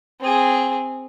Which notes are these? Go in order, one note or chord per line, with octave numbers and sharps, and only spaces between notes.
C4 G#4